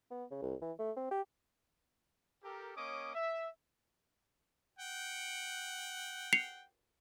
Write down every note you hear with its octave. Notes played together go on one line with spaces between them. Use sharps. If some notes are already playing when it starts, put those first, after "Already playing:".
B3
C#3
C2
E3
A3
C4
G4
G4 A4 A#4
A#3 C#4 C#5 D#5 D6 D#6
E5
F#5 G5
C7 C#7 F7